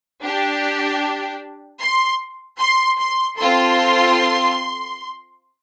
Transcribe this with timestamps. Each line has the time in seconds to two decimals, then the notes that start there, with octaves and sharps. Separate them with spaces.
0.22 D4 G4
1.80 C6
2.59 C6
2.99 C6
3.38 C4 F4 A4 C6